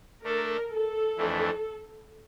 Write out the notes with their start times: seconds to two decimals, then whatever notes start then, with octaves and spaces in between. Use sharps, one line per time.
0.23 A3 D4 A4 A#4
0.71 A4
1.17 F2 E3 A3 D4